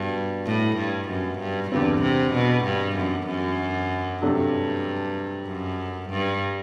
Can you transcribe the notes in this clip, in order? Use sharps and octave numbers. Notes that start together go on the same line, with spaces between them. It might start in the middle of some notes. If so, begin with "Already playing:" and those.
Already playing: G2 B2 G3
A2
G2
F#2
G2
E2 G2 D3 G3 C4
C3
B2
G2
F#2
F#2
G2 C3 F#3 A3 D4 A4
F#2
G2